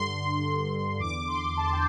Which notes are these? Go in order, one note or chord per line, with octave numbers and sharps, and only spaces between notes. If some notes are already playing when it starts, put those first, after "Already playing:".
Already playing: G2 D3 C6
E2 D3 D6
C6
A5
G5